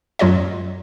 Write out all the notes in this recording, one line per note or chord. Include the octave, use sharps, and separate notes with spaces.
F#2 F#3 F4 C#5 D#5